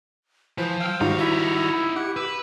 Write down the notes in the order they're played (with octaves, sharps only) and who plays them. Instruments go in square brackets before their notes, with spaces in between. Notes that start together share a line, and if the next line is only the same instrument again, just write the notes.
[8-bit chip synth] E3 [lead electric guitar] F3 [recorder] C5
[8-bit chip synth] F5 [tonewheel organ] G5 E6
[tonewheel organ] G#2 D#4 F4 [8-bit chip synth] D#3 G3 F#4 [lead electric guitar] F5
[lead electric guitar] D#4 E5 [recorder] E4 [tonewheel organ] A#5
[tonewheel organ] G4 [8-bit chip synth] F#5
[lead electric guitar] B4 [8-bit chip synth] E6